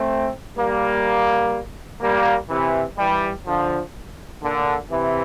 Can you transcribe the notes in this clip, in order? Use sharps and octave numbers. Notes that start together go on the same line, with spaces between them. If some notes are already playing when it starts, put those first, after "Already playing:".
Already playing: A3 C4
G3 A#3
G3 A#3
C3 E3
E3 G3
D3 F3
A#2 D3
C3 E3